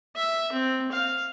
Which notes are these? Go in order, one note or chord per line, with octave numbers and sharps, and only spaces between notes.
E5
C4
F5